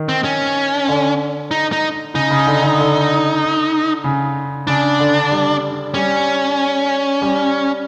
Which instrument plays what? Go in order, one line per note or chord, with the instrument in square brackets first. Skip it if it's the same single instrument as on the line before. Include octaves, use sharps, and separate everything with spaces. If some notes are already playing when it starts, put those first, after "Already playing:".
Already playing: [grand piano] D#3
[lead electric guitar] C4
C#4
[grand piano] D3
[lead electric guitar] D#4
D#4
[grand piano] C#3 [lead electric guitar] D#4
[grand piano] C#3
D3
D3
D3
C#3
[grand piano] C#3 [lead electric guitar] D4
[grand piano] D3
G3
[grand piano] G3 [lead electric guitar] C#4
[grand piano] G3